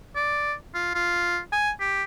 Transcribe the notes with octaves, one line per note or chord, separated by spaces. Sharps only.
D5
F4
F4
G#5
G4